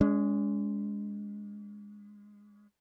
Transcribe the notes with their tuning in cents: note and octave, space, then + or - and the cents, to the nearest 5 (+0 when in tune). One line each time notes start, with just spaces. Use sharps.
G#3 -10 C#4 +45